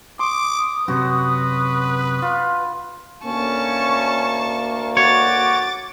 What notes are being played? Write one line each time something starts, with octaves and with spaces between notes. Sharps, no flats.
C6 D6 D#6
F#2 C3 C#4 F#4 B4
F4
D2 A#3 C#4 A5 C#6
F#4 C#5 D6 A6